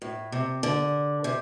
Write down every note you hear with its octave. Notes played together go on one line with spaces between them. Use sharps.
A2
C3
D3
C3